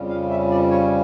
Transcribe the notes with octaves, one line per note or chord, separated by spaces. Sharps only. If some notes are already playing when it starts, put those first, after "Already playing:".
Already playing: F2 C#3 G3 C#4
F5
E5
D5
C#5